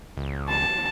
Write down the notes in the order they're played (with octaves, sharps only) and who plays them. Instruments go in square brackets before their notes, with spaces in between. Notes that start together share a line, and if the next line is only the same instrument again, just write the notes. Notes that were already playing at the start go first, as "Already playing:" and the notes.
[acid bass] C#2
[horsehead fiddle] A5